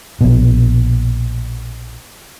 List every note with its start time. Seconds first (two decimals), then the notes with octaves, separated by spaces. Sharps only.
0.21 A#1 B2